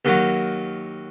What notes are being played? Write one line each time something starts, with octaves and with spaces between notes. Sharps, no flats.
D#2 D#3 F#3